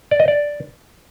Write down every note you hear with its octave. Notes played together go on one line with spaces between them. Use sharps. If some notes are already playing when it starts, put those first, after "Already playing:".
D5
D#5
D5